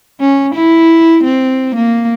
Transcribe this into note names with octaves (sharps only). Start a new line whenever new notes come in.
C#4
E4
C4
A#3